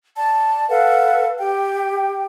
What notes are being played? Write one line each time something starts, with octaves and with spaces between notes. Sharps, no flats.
D5 A5
A4 B4 F5 F#5
G4 G5